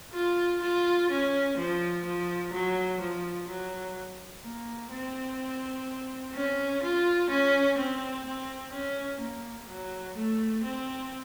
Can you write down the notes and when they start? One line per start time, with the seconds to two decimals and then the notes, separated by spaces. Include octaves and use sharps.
0.13 F4
0.62 F4
1.10 C#4
1.57 F3
2.04 F3
2.53 F#3
3.00 F3
3.48 F#3
4.43 A#3
4.91 C4
6.34 C#4
6.82 F4
7.29 C#4
7.77 C4
8.25 C4
8.73 C#4
9.20 A#3
9.68 F#3
10.16 A3
10.63 C4